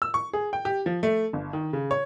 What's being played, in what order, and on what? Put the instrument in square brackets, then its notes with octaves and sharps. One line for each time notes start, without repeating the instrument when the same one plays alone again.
[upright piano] E6
C#6
G#4
G5
G4
F3
A3
G1
D#3
C#3
C#5